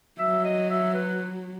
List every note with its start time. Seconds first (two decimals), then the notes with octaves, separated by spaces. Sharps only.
0.19 F#3 E5
0.44 D#5
0.70 E5
0.94 B4